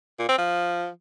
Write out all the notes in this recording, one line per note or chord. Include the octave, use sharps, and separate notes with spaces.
A#2
C4
F3